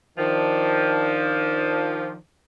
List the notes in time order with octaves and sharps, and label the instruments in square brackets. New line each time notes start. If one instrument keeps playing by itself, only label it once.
[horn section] D#3 F3 D4